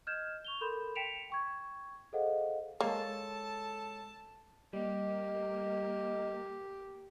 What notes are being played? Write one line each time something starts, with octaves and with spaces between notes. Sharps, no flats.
D#5 F6 G6 G#6 E7
C#6 F7 G7
A4 A#4 B5 C6 G6 E7
G5 B6 C#7 D7 E7 F7
G5 C#6 G#6
G#4 A4 C5 D#5 F5 F#5
G#3 A#3 A4 C#5 A5
G3 A#3 G4 D#5